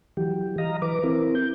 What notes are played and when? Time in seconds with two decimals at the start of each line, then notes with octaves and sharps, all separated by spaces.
0.17 E3 F#3 G4
0.58 D#5 F5 A#5
0.82 E3 B4 D6
1.04 C4 E4 A#4
1.35 G6